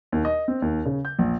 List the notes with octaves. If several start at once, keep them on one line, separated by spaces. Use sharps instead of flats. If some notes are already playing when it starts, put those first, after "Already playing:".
D#2
D#5
C4
D#2
C#3
G6
A#1